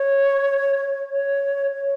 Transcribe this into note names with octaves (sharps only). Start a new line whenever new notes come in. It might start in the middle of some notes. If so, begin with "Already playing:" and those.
Already playing: C#5
C#5
C#5